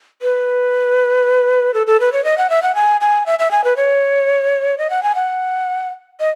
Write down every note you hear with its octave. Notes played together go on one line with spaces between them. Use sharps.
B4
A4
A4
B4
C#5
D#5
F#5
E5
F#5
G#5
G#5
E5
E5
G#5
B4
C#5
D#5
F#5
G#5
F#5
D#5